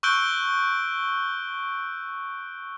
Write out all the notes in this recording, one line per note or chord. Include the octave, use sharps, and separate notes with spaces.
C#6 E6 F#6 G6 D7 G7